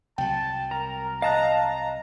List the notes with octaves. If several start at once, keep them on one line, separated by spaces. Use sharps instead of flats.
C2 F#3 G5 A5
A#4 A#5
D#5 F5 A5 A#5 F#6
A#5